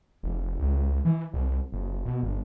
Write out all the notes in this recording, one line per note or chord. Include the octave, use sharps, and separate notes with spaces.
F1
C#2
E3
C2
F#1
B2
G1